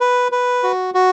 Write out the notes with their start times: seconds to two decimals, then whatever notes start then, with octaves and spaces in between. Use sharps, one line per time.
0.01 B4
0.32 B4
0.63 F#4
0.94 F#4